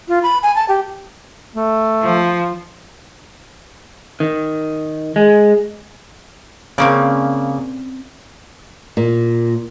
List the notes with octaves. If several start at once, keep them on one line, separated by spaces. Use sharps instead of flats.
F4
B5
G#5
A5
G4
A3
F3
D#3
G#3
C#3 A#3 C4 C#4 D5
A#2